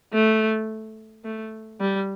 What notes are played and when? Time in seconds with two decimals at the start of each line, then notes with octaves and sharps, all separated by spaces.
0.13 A3
1.25 A3
1.81 G3